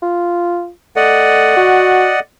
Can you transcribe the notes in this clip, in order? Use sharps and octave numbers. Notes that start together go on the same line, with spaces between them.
F4
A3 D5 D#5 F#5
F#4